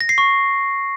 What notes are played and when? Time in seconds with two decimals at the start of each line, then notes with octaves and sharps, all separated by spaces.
0.01 A#6
0.09 C7
0.18 C#6